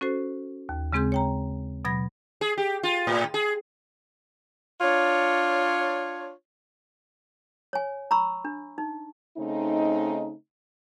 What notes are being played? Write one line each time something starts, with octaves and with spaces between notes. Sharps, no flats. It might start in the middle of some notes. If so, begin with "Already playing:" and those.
C#4 F#4 A4 C5
D#2
C#3 G#3 C4 G#4 C6 G6
C#5 G5 A#5
B2 F#3 B5 G#6 A#6
G#4
G4
F4
A2
G#4
D4 F4 C#5
C#5 G#5
A#5 B5 C#6 E6
D4
D#4
C#3 A3 C4 D#4